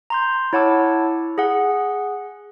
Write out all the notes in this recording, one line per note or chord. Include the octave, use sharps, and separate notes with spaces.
A#5 C6 G6
E4 C#5 F#5 A5 D6 E6
G#4 F#5